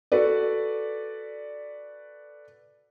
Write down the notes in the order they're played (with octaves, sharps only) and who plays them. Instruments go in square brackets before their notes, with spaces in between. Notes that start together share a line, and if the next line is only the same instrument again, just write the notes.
[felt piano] F#4 A4 B4 D5